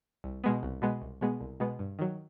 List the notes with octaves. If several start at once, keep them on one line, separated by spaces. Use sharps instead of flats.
C2
B2 G#3 B3
C2
B2 G#3 B3
C2
B2 G#3 B3
C2
B2 G#3 B3
G2
D#3 F#3